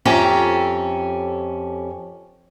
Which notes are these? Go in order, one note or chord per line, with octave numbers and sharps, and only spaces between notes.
F2 C#4 G4 A4 E5 A#5